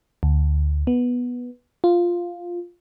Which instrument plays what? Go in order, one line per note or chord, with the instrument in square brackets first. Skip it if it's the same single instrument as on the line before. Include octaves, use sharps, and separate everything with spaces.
[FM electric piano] D2
B3
F4